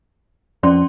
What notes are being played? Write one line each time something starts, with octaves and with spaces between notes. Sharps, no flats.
F2 C#4 D5 C6